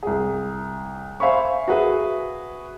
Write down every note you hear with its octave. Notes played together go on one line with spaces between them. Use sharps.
C2 G#4
C5 E5 F5 G#5 B5 C#6
F#4 G#4 B4 E5